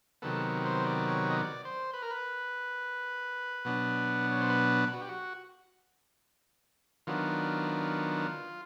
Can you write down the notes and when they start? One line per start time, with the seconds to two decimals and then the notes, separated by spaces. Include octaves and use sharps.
0.22 C3 D#3 F#3 B3 A4
0.65 C5
0.86 D5
1.08 C#5
1.30 D#5
1.36 D5
1.65 C5
1.93 B4
2.02 A#4
2.11 B4
3.65 B2 F#3 B3 D4
4.31 C#5
4.41 C5
4.50 B4
4.93 F#4
5.01 G4
5.09 F#4
7.07 D#3 F#3 B3 D4 F4